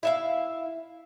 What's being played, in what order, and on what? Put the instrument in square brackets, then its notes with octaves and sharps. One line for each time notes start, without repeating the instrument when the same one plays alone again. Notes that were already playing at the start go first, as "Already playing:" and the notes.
[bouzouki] E4 E5 F5